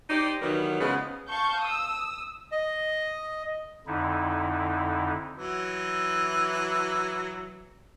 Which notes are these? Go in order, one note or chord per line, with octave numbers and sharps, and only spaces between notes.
D#4 G4 C5 D5
D#3 E3 F#3 G3 B3
C#3 F3 G#3 B3
F5 A5 C#6 G6
D#6 E6
D#5
F2 D3 D#4 E4
E3 F#3 E6